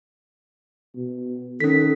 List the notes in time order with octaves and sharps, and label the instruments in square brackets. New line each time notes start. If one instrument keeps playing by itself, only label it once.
[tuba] B2
[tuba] D#3 [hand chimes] C#4 B6 [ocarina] A4